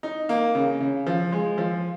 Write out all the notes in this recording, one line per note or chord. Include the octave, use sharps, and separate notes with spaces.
D#4
A#3
C#3
C#3
F3
G#3
F3